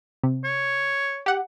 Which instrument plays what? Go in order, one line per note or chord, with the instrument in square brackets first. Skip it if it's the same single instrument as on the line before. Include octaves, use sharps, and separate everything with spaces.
[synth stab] C3
[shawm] C#5
[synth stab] G4 F#5